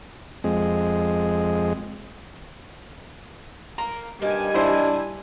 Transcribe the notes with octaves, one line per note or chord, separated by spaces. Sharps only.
F2 G#3
A#3 A#5
G2 D#3 G3 G#5
D4 E4 C5 E5